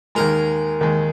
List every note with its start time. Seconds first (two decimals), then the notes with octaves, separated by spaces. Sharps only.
0.15 D#2 D#3 G#3 A#4
0.81 D#2 D#3 G#3